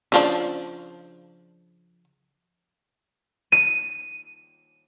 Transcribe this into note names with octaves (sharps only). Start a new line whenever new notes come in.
C#3 F3 D4
D#7